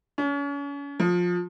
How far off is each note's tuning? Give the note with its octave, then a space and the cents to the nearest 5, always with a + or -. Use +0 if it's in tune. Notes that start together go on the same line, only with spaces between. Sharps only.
C#4 +35
F3 +20